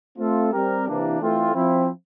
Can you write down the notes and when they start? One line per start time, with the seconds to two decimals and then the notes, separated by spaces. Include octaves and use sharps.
0.18 A3 C4 F4 A4
0.52 G3 C4 G4 A#4
0.86 C3 E3 A#3 D4
1.20 E3 A3 C4 F4
1.54 F3 C4 E4